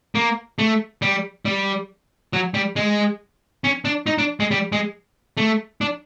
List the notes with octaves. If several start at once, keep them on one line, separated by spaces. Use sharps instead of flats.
A#3
A3
G3
G3
F#3
G3
G#3
C#4
D4
D#4
D4
G#3
G3
G#3
A3
D4